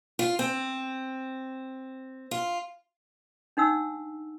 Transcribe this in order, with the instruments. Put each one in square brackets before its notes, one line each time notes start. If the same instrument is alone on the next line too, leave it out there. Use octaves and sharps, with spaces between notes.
[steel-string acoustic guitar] F4
C4
F4
[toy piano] D4 D#4 F#5 E6